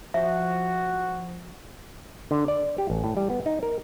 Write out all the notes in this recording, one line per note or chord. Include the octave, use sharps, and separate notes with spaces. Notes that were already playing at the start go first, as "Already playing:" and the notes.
F3 F#4 E5
D3
D5
G4
A1
A2
G3
B3
D#4
A#4